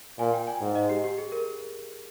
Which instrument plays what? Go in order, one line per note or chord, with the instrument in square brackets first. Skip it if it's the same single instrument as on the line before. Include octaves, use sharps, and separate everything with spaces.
[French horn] A#2 [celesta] G#5
[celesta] G5
G#5
[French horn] G#2
[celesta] D#5
G4
G4
G#4
A#4